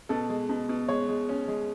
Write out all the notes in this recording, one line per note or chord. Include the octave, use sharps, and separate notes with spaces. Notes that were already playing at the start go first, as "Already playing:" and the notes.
B2 A4
G#3
B2
B2
G#3 C#5
G#3
C#4
G#3